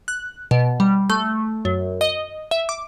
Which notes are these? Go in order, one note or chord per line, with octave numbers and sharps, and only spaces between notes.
F#6
B2
G3
A3
F#2
D#5
E5
D6